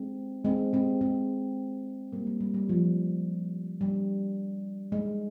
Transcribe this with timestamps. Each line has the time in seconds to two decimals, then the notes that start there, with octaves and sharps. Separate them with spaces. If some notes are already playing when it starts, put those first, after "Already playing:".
Already playing: G#3 C4
0.45 G#3 C4
0.73 G#3 C4
1.01 G#3 C4
2.13 G3 A#3
2.27 G3
2.41 G3
2.54 G3
2.69 F3
3.81 G3
4.92 G#3